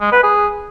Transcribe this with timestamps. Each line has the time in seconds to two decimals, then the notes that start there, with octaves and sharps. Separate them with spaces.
0.01 G#3
0.12 B4
0.24 G#4